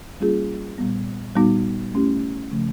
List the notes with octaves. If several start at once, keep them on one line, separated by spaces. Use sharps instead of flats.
G3 A#3 C#4 F4 G#4
A#2 G3 B3
A#2 G3 B3 D#4 F#4
A3 C#4 E4 G4
C#3 F3 A3